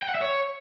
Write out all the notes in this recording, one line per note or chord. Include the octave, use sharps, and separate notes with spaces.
G5
F#5
E5
C#5